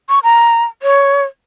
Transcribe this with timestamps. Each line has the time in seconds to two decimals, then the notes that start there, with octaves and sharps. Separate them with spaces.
0.09 C#6
0.23 A#5
0.83 C#5